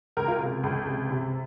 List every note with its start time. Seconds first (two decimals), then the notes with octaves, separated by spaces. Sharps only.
0.17 C#2 A#4
0.28 F4
0.41 C3
0.63 C#2
0.87 C3
1.10 C3